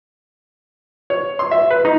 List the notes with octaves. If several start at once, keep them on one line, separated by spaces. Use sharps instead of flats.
C#5
C6
E5
B4
D#4